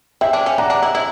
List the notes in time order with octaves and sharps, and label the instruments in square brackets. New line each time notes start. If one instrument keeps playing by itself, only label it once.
[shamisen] E4 [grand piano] E5 G5
[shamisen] D4
C#4
[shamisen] D4 [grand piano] F#5 A#5
[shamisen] D4
E4
E4